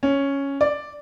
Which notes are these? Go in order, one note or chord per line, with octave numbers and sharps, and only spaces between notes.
C#4
D5